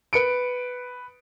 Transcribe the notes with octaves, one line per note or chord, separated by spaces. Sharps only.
B4 C#7 D7